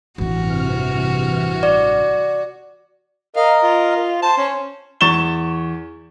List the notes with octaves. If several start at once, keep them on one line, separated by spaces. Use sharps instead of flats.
A1 G2 C3 E3 F#4 F6
D5
A#4 D#5 F5
F4
C5 A5
C#4
E2 C#6 A6 E7 G7